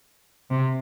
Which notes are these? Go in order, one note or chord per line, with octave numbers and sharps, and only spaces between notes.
C3